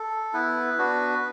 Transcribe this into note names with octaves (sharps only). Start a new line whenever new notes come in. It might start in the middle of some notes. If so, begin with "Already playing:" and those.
Already playing: A4
B3 E4 B4
B3 D4 F#4